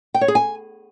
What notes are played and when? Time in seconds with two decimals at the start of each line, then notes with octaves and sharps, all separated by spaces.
0.14 G5
0.21 C#5
0.28 G#4
0.35 G#5